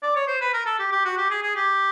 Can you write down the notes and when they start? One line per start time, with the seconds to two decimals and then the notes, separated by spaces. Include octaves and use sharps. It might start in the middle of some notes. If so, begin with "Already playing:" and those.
0.03 D5
0.16 C#5
0.28 C5
0.41 B4
0.54 A#4
0.66 A4
0.79 G4
0.92 G4
1.05 F#4
1.18 G4
1.30 G#4
1.43 G#4
1.56 G4